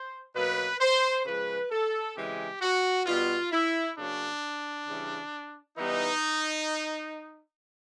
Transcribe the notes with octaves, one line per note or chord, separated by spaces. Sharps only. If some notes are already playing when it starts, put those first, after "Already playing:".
Already playing: C5
B2 F#3 A#3 B4
C5
C#3 F3 G#3 B4
A4
C#3 E3 G#3 C4 G4
F#4
B2 G3 B3 F4
E4
C#3 F#3 A#3 C#4 D4
C#3 E3 G3
E3 G3 B3 D#4